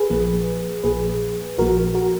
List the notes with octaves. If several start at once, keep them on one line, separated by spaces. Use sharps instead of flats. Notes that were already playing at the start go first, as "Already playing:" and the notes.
Already playing: G#4 B4
A#1 A#2 F3 A#3
A#1 A#2 F3 A#3 G#4 B4
A#1 A#2 F3 A#3 F#4 A#4
F#4 A#4